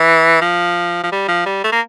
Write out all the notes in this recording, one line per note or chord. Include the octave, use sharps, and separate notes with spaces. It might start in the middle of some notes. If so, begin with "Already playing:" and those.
Already playing: E3
F3
F3
G3
F3
G3
A3
A#3